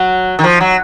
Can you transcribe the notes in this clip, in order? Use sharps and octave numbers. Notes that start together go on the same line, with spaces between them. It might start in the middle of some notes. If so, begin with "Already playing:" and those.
Already playing: F#3
D#3
F3
F#3